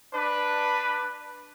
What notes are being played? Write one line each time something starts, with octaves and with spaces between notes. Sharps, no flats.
D4 B4